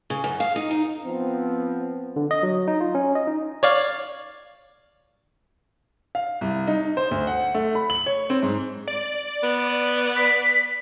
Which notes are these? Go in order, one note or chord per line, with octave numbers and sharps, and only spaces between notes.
C#3
F#2
F5
D#4
D#4
F3 B3 C4
D3
D#5
F#3
D#4
F4
C#4
D#5
D#4
C#5 D5 F5
F5
C2
D#4
C5
D2
F#5
A3
B5
F#7
C#5
C4
G#2
D5
B3
B6